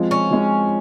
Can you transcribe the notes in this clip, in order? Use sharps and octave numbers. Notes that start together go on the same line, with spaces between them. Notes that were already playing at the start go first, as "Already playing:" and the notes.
Already playing: F3 G#3 C4
C#4
F3 G#3 C4